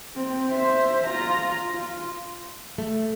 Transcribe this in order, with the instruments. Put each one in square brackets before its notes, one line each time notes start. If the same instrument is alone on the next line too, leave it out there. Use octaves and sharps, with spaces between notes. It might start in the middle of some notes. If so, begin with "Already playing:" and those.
[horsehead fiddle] C4
C5 E5
F4 A#5
F4
[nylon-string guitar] A3